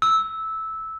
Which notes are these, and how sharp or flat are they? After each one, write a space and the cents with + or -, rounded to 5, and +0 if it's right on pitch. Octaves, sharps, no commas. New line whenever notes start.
E6 -10